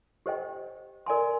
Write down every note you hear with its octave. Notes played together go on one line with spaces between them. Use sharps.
G4 C5 D#5 G5
A#4 D5 G#5 C6